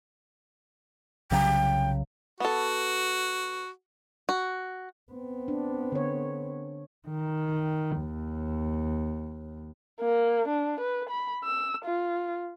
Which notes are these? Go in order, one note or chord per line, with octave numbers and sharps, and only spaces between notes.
C2 C#3 F#3 G5
B3 F#4 A4
F#4
B3 C4
D4
D3 C#5
D#3
D#2
A#3
D4
B4
B5
E6
F4